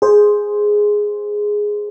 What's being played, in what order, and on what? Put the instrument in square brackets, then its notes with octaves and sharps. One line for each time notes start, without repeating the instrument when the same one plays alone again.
[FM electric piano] G#4 C5